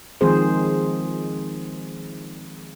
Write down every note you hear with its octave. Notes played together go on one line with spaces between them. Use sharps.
D#3 F3 G#3 C4 G#4 C5